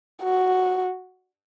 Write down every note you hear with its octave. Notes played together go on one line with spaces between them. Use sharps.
F#4